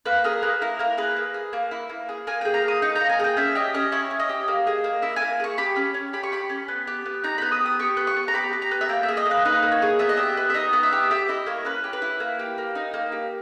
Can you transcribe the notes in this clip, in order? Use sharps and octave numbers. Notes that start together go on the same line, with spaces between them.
A#3 B4
G#4 A#4
A#3 B4
E4 A#4
A#3 A#4
G#4 B4
A#3
G#4
A#3
E4
A#3
G#4
A#3 G#5
G#4 G5
A#5
A#3 D#6
D#4 C#6
A#5
A#3
G#5
G#4 G5
C#4 E5
G4 D#5
C#4 D#5
E4 C#5
C#4
D#5
G4
A#3
G#4
A#3
E4 E5
G#5
A#3
G#4 C#6
G4 B5
C#4
C#4
G4 B5
C#6
G4 B5
C#4
B3
G4
B3
D#4 A#5
B3 B5
D#6
G4
D#6
G4 C#6
B3
C#6
B3
A#5
G4 B5
G4
A#5
B3
E5
A#3 G5
E5
G#4
D#5
A#3
B4
D#4 B4
A#3
C#5
G#4
B3 E5
D#5
G4 E5
B3
E5
D#4 D#5
B3
E5
G4
G4 E5
E4 D#5
A#3 C#5
C#4 B4
G4
B4
E4
A#3
G4
A#3
D#4
A#3
G4